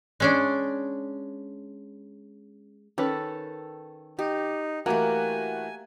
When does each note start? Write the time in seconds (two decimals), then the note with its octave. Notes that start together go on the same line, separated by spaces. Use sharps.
0.20 G#3 C#4 D4
2.98 D#3 C#4 A4 B4
4.19 D#4 G4
4.86 E3 A3 A#3 F#4 G4 A#4 G#5